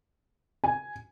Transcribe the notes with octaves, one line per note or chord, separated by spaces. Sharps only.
G#5